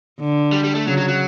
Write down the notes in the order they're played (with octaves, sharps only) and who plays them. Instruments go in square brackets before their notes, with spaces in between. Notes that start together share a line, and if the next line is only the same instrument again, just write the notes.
[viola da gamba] D3
[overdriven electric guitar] G3
G3
A3
[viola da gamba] C#3 [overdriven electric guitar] F#3
[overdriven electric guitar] F#3
F#3